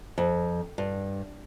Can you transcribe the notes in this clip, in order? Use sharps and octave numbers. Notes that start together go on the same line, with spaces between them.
F2
G2